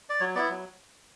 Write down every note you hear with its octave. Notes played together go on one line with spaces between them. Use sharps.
D5
F#3 C#5
B3 E4 D5
F#3